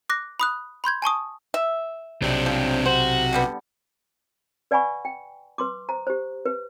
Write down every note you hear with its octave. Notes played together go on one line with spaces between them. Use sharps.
D6 F#6 A#6
B5 D#6 F#6
B5 C6 G6 G#6
G#5 A5 C#6 D#6
E5
B1 C3 C4 D4
F3
F#4 C5
D3 G3 B3
B4 D5 F#5 G#5 B5 C#6
G5
B4 C6 D6
C5 A#5
G4 C5
B4